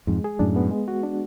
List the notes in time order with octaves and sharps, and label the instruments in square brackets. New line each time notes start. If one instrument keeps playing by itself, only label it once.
[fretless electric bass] F2 G#2 [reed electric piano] G#3
[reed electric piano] G#4
[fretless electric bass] F#2 A2 [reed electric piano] D4
[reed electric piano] B3
G#3
F#4
D4